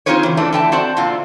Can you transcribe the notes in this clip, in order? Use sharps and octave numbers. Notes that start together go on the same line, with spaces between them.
C4 D#4 F4 G#4 B4 C#5
C#3 E3
F2 E3 A3 D4
D3 E3 A3 G5 A5
C4 F#4 C5 D5 A5
A#2 D3 F4